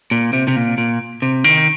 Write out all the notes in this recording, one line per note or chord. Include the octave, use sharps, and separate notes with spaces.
A#2
C3
C3
A#2
A#2
C3
D#3